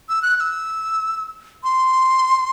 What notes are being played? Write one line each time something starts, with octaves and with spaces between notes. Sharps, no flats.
E6
F#6
F#6
E6
C6